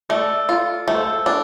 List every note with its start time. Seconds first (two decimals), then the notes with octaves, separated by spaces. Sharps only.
0.09 A3 A4 D5
0.49 F4
0.87 A3 A4
0.95 C5
1.02 A4
1.26 D4